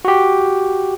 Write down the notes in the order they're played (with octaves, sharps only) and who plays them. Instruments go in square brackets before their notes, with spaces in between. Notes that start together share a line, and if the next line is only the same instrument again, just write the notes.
[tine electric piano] F#4 G4